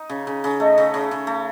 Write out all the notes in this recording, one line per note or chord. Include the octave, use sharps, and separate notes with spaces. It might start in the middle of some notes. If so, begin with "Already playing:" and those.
Already playing: D#4
C#3
C#3
C#3
A3 D#5
C#3
C#3
C#3
A3